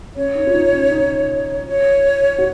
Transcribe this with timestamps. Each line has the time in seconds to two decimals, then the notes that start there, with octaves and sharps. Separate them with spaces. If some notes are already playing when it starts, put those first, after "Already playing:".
0.15 C#4 C#5
0.35 D#4
0.47 F4
0.54 D#4
0.73 C#4
0.92 D#4
1.67 C#5
2.38 F#4